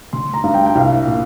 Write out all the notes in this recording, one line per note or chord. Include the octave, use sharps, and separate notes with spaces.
G1 C6
A#5
G2
G5
G5
C2 F5
A#2